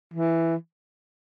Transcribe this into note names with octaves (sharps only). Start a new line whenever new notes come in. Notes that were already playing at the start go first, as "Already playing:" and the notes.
E3